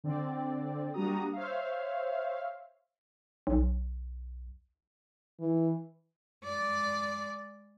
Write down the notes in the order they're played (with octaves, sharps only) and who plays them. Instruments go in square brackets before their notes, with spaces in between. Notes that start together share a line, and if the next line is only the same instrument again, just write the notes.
[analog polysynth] D3 C4 D5
G3 A#3 D4 F#4 A#5 D#6
C5 C#5 E5 F5
[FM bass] B1
[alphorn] E3
[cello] G#3 D5